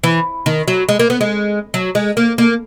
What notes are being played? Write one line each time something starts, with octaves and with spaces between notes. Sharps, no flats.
E3
D#3
F#3
G#3
A#3
B3
G#3
F#3
G#3
A#3
A#3